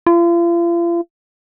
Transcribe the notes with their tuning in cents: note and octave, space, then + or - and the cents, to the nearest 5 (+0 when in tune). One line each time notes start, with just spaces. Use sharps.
F4 -40